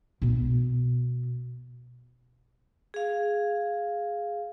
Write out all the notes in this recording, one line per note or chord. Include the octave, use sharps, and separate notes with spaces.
B2 B3
G#4 F5